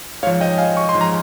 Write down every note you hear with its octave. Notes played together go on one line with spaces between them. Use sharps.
G#2 F3 C#5 F5
D#5 G5
F5 G#5
C#6
C6
G#2 F3
A#5